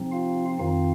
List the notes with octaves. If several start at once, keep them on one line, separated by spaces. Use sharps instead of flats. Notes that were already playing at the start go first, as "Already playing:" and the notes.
Already playing: C3 F3 C4 D#4
F4 F5
F2 D#3 C4 D#4 F4 F5